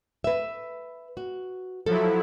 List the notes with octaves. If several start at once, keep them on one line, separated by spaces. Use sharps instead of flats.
B4 E5
F#4
F3 F#3 E4 A4